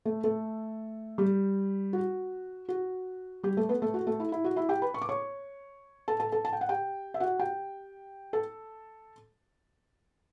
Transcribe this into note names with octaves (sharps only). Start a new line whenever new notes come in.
A3 A4
A3 A4
G3 G4
F#4
F#4
G3 G4
A3 A4
B3 B4
A3 A4
F#4
A3 A4
E4
E4
F#4
E4 E5
G4 G5
B4 B5
C#6
D6
C#5 C#6
A4 A5
A4 A5
A4 A5
A5
G5
F#5
G4 G5
E5
F#4 F#5
G4 G5
A4 A5